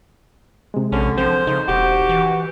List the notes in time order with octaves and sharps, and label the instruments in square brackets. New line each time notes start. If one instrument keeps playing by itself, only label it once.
[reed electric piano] C3 G#3
[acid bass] A#1 [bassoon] D3 [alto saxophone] C#4
[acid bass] F3 [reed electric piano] C4 [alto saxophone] C5
[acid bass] C#3 [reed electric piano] D#4
[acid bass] E1 [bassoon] F#4 [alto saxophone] G4
[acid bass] E3